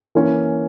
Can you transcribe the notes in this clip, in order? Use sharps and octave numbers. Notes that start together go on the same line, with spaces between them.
E3 A#3 C#4